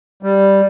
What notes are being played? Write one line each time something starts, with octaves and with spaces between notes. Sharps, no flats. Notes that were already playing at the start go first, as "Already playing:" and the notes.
G3